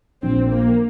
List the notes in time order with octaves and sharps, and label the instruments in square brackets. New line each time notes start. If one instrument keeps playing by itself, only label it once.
[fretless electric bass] A#1 A#2 F3 D4 [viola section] C4
[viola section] A#3